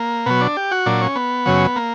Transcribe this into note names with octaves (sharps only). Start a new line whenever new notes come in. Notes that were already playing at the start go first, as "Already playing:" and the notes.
Already playing: A#3
B2 F#3 B3
D4
G4
F#4
A#2 F#3 D4
C#4
B3
F#2 C#3 F#3
A#3